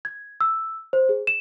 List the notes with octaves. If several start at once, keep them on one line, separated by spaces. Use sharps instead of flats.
G#6
E6
C5
G#4
E7